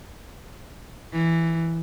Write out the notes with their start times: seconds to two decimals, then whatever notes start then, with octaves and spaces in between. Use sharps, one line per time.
1.12 E3